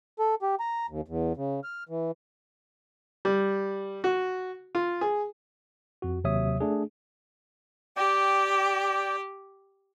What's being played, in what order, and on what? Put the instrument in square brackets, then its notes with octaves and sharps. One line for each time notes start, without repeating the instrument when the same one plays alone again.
[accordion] A4
G4
A#5
D#2
E2
C#3
F6
E3
[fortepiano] G3
F#4
F4
G#4
[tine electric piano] F2 F#4
D#2 C3 F#3 C#5 E5 D#6
A3 D4 G#4
[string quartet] G4 [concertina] D5 G5